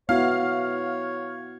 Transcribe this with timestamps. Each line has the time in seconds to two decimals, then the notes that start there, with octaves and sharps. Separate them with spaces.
0.09 B3 E4 F#4 C#5 F5